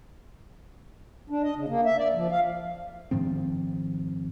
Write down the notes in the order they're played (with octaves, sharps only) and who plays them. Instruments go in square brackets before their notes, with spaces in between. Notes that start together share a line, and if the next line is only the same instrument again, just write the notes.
[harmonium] D4
D#5
C#3
A#3
E5
D5
F3
F5
[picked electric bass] G#2 D#3 F3 C4